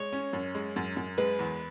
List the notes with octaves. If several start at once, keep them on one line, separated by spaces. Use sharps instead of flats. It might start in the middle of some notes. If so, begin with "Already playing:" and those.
Already playing: G#3 C#5
C#4
F#2
G#3
F#2
F#2
G#3 B4
E2